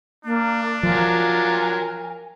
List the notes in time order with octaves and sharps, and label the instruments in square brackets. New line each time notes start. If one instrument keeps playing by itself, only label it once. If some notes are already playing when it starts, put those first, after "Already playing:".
[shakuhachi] A#3 [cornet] D4
[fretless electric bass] F3 [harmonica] F#3 F4 A#4 [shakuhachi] G#5